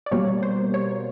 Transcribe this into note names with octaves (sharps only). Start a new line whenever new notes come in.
D5
B2 G3 A#3 C#5
C5
C#5